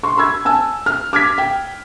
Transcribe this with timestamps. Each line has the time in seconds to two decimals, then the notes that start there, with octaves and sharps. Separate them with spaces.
0.03 C6 C#6
0.18 B5 E6 G#6
0.45 G#5 A5 E6
0.86 F6
1.13 D6 F6 G#6 B6
1.38 G5